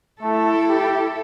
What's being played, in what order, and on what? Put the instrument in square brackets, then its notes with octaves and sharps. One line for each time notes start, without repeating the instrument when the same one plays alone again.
[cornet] A3 [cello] E4 A4
[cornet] G4